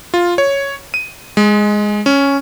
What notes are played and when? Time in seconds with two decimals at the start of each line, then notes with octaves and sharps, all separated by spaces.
0.14 F4
0.38 C#5
0.94 D#7
1.37 G#3
2.06 C#4